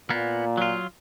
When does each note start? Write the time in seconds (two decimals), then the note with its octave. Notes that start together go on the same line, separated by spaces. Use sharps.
0.10 A#2 A#3 B3
0.57 F#3 F4